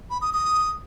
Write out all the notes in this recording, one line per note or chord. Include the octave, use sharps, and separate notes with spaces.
B5
D#6
D#6